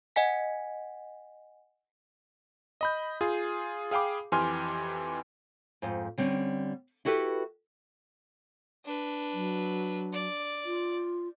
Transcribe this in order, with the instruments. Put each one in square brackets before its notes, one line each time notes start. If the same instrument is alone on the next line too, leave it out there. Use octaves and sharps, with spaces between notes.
[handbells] D#5 F#5 G#5 B6
[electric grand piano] D#5 B5 G6
F4 G#4
G#4 F5 G5 B5 D6
F2 E3 G4 G#5 C6 F6
[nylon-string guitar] F2 G#2
D3 G3 C4 C#4
E4 F#4 G4 A4 B4
[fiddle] D4 B4
[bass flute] F#3
[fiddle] D5
[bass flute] F4